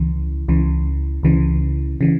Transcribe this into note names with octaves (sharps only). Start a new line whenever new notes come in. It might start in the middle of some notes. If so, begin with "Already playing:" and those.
Already playing: C#2 C#3 E3
C#2 C#3 E3
C#2 C#3 E3
C#3 E3